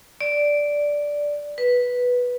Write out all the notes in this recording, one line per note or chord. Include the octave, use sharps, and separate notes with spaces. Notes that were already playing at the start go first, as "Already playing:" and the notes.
D5
B4